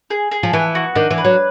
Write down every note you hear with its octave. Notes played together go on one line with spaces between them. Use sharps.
G#4
G#4
F3
E3 B3
F#4
D#3 D4
E3
B4
F#3